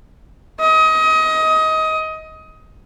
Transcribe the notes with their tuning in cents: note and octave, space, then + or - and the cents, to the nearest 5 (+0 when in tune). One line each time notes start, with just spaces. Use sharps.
D#5 +25